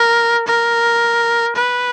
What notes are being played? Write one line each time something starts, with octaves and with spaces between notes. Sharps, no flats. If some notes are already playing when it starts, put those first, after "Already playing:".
Already playing: A#4
A#4
B4